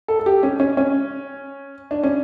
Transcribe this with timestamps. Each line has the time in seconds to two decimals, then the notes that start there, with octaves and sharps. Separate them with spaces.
0.08 A4
0.19 A4
0.26 G4
0.43 C#4
0.60 C#4
0.77 C#4
1.91 D4
2.03 C#4